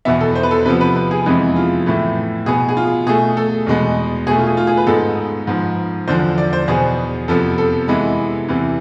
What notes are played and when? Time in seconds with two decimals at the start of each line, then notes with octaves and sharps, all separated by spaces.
0.05 E2 B2 B3 E5
0.21 A4
0.35 C5
0.43 B4
0.51 A4
0.66 C3 B4
0.68 F3 B3
0.81 B4
0.96 B4
1.11 G#4
1.26 F2 C3 E3 G#3 B3 G#4
1.56 F4
1.86 A2 E3 A3
2.46 B2 B3 G#4
2.69 G#4
2.77 F4
3.06 B2 A3 G#4
3.37 A4
3.67 E2 B2 G#3 B3
4.27 B2 A3 G#4
4.38 F4
4.47 G#4
4.57 F4
4.67 G#4
4.77 B4
4.87 G#2 G#3 B3 A4
5.47 G#2 F3 B3
6.08 E2 D3 F3 C5
6.38 D5
6.53 C5
6.67 E2 B2 B3 G#4
7.28 F2 C3 F3 B3 A4
7.58 A4
7.88 C3 E3 G#3 B3
8.48 E2 C3 E3